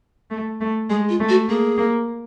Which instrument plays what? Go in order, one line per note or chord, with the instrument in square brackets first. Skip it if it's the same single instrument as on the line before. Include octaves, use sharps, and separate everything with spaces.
[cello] A3
A3
[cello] G#3 [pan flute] G#4
[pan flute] F4
[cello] A3
[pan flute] F#4
[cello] A#3 [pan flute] G#4
[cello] A#3